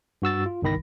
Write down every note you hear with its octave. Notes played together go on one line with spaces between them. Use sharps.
G2 F#4 E6 A6
F4
G1 C2 D#3 B5 A#6